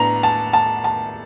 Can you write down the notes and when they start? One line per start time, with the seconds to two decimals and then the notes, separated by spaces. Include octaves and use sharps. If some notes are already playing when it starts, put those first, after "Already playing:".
Already playing: A2 B3 D4 A#5
0.23 A5
0.53 A5
0.84 A5